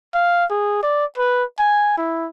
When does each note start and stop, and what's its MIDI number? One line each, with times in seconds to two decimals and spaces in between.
0.14 0.45 77
0.50 0.82 68
0.83 1.05 74
1.18 1.43 71
1.59 1.97 80
1.98 2.27 64